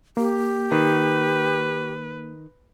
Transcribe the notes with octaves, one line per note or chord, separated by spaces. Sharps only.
A#3 G4
D#3 B4